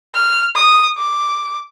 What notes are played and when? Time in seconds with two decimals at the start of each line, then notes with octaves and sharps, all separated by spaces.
0.15 F6
0.56 D#6
0.98 D6